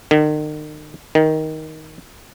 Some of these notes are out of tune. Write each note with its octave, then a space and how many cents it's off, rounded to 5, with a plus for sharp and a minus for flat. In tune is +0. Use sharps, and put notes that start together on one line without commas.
D#3 -40
D#3 +10